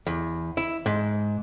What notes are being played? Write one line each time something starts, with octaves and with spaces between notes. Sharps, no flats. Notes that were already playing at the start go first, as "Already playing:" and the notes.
E2
E4
G#2